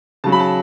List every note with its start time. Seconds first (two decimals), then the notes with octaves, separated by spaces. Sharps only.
0.24 C#3 F#3 A5
0.32 B5
0.39 A5